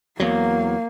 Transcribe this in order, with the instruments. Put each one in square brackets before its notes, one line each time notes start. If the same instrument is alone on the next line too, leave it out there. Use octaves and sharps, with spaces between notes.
[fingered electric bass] E2 F#3 [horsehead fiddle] A#3